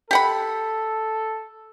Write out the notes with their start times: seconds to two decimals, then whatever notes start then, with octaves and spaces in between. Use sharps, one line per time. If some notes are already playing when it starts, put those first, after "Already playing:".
0.11 G4 A4 F#5 B5